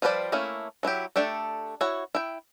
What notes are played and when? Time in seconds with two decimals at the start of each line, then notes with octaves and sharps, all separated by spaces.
0.02 F3 G3 B4 C5 D5
0.32 A3 A#3 C#4 E4
0.83 F#3 E4 F#4 G4
1.16 A3 D4 G4 A4
1.81 E4 F#4 C#5
2.15 E4 G5